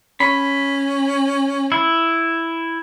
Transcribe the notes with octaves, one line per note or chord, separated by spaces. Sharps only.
C#4 B5
E4